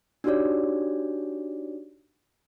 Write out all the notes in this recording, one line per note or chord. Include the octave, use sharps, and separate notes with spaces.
D4 D#4 F#4 G4 C#5 D5